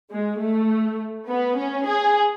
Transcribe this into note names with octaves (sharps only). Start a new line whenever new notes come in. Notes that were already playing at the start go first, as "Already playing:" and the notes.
G#3
A3
B3
C#4
G#4